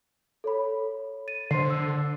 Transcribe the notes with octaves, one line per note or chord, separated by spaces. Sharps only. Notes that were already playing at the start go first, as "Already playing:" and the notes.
A4 C#5 B5
A6 D#7
D3 C5 C6 C7
E6